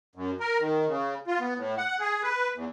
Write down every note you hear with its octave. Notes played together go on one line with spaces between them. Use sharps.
F#2
A#4
D#3
C#3
F4
B3
A2
F#5
G#4
B4
E2